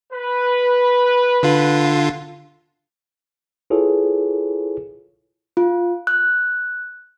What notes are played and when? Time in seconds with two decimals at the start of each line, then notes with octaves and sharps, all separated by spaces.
0.13 B4
1.43 D3 F4
3.70 E4 F4 G#4 A4 B4 C#5
5.57 F4
6.07 F#6